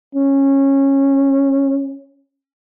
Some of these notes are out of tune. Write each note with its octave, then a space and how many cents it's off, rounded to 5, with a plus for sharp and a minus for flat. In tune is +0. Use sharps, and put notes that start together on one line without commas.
C#4 -15